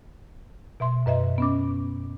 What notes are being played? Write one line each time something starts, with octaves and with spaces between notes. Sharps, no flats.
B2 E5 C6
F#2 B4 D#5 E5
B3 C#4 D6